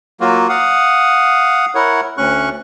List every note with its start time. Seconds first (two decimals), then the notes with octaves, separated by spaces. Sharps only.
0.21 F#3 A#3 F4 F#4
0.49 F5 F#5 D#6
1.75 E4 A#4 C#5 F#5
2.18 D2 C#4 C#6 F#6